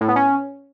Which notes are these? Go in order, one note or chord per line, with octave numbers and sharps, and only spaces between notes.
A2
B3
C#4